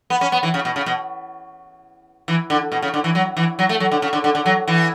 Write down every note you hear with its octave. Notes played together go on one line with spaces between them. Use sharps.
B3
C#4
B3
E3
C#3
B2
C#3
B2
E3
D3
B2
C#3
D3
E3
F#3
E3
F#3
A3
F#3
D3
C#3
D3
D3
D3
F#3
E3